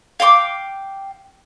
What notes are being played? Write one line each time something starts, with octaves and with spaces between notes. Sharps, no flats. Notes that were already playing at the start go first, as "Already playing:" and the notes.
F5 G5 C6 D6